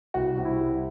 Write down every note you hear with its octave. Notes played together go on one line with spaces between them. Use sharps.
C2 F#4
C3
E4
C2